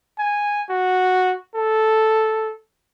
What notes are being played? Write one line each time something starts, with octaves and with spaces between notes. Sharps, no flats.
G#5
F#4
A4